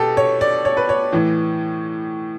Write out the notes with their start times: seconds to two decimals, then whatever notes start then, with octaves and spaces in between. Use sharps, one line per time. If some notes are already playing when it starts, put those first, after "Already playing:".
Already playing: B2 G4 A4
0.17 C#5
0.41 D5
0.65 C#5
0.77 B4
0.89 C#5
1.12 A2 E3